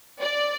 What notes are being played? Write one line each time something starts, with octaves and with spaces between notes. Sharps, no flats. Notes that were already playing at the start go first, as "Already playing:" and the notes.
D5